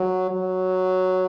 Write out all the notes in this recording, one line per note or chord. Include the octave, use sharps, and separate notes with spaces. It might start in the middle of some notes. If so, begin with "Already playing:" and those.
Already playing: F#3
F#3